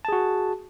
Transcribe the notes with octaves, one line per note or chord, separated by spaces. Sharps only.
F#4 G#4 A5